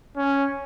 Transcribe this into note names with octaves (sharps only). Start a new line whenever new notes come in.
C#4